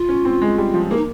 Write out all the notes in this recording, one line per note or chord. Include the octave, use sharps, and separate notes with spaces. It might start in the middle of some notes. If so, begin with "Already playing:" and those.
Already playing: F4
C#4
C4
G#3
G3
F3
A#3 G#4
D#4